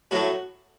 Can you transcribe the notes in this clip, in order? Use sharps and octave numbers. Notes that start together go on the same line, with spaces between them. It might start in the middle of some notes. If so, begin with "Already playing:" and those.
A2 F#3 A3 F#4